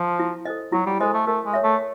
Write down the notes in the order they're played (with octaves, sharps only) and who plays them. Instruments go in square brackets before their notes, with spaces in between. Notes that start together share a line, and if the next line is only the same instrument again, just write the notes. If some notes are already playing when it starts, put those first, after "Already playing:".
Already playing: [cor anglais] F3
[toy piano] E4
A4 C5 D#5
[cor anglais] F#3 [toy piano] E4
[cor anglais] G3
[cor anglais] G#3 [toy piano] A4 C5 D#5
[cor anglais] A3
[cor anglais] A3 [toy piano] A#4
[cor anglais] G#3
[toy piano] C#5 E5
[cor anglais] A3